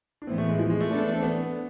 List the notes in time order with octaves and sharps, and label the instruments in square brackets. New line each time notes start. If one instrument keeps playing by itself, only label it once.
[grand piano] D4
[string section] A2 E3 B3 [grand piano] C4
[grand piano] A3
G#3
F3
G#3
A3
[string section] E3 B3 D4 A4 D5
[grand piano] C4
B3